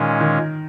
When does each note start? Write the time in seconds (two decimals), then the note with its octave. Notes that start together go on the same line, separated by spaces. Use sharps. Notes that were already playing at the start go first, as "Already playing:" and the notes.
Already playing: A#2 D#3 G#3 C#4
0.21 D#3